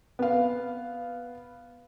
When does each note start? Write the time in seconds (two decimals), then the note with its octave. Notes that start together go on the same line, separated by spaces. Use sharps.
0.19 B3 F5